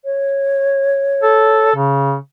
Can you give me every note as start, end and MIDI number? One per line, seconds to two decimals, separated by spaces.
0.05 1.69 73
1.22 1.72 69
1.76 2.16 49